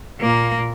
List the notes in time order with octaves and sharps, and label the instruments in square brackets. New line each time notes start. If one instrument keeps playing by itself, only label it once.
[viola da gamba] A#2 [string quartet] A#3